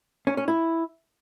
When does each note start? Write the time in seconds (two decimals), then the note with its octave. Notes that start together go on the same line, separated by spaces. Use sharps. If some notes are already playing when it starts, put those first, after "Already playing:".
0.27 C#4
0.37 C#4
0.48 E4